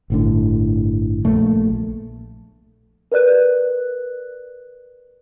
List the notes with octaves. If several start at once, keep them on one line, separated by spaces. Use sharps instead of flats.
G1 A2 D3
A#1 F#2 A#2 A3
A#4 B4 D5 F#6